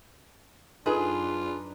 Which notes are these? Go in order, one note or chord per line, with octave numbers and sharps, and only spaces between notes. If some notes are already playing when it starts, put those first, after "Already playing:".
F#2 D4 D#4 F4 G#4 B4